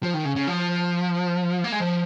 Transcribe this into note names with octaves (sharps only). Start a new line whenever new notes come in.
F3
D#3
C#3
C#3
F3
A#3
G#3
F3